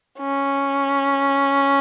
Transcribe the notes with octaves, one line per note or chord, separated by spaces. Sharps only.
C#4